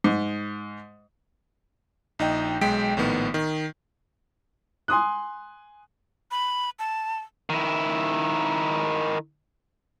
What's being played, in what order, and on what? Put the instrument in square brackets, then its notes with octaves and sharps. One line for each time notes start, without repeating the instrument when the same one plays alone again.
[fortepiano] G#2
[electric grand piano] A#1 D#4 D#5 G5
B1 G#3 G5 B6 D7
A#1 A2 D#3 B3
D#3
[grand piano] G#5 C6 D#6 F#6
[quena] B5
A5
[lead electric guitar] D#3 E4